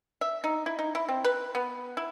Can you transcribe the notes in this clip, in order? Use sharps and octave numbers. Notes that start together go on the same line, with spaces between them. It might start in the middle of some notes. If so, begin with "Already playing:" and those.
E5
D#4
E4
D#4
E4
C4
B4
B3
E4